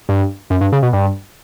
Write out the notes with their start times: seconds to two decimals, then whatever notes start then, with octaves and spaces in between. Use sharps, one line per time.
0.09 G2
0.50 F#2
0.61 G2
0.72 C#3
0.83 B2
0.93 G2